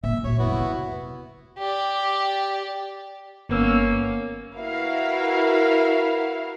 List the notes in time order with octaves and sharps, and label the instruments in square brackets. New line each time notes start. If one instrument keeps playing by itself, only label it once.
[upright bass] A#2 [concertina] E5
[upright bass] F#3 [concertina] C#5
[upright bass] F2 [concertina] B3 E4 F#4
[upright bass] C3
[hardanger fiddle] G4 D5
[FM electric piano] G1 B3 E6 [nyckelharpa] A#3 C#4
[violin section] E4 F#4 A#4 B4 F5